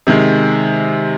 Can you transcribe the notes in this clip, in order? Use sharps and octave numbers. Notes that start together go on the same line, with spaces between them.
C3 D#3 G#3